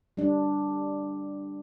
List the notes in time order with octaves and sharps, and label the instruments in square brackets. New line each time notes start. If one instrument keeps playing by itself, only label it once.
[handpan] G3 D4